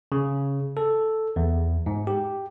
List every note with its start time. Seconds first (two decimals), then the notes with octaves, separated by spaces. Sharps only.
0.12 C#3
0.77 A4
1.36 E2
1.86 G#2
2.07 G4